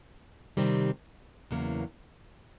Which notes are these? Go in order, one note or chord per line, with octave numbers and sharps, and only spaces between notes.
C3 D#3 G3 C4
E2 C#3 F#3 A#3